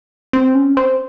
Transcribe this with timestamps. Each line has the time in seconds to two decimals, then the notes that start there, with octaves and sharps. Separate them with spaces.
0.33 C4
0.55 C#4
0.77 C4